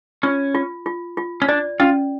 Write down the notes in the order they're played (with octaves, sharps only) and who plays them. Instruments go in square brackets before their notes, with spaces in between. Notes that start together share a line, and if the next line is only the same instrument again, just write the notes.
[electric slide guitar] C#4 [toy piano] F4
[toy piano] F4
F4
F4
[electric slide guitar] C#4
[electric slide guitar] D4 [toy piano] D5
[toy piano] C#4 [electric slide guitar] F4